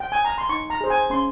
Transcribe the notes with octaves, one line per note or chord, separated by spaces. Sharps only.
G5
G#5
A#5
C6
D#4 C#6
A#5
G#4 C5
G#5
C#4 C6